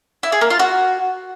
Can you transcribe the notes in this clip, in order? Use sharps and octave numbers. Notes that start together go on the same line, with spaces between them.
E4
G#4
A#3
F4
F#4